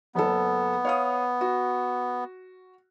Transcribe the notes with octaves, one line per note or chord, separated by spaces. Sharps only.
F#1 B3 A4
C#5 F5 D#6
F#4